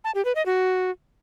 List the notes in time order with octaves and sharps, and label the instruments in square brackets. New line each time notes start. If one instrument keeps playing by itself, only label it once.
[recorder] A5
G4
B4
D#5
F#4